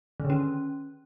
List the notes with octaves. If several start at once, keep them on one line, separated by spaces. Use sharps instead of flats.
D#3
D3
C#4